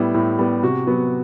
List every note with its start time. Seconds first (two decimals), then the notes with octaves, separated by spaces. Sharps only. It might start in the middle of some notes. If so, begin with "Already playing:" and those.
Already playing: A2 G3 B3 E4
0.14 A2
0.39 G3 B3
0.63 C3 F#4
0.87 F#3 B3